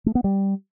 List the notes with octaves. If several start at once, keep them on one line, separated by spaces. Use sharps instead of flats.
A3
B3
G3